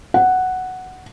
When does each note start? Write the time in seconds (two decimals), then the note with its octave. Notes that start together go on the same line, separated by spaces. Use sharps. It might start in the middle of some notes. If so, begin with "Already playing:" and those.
0.14 F#5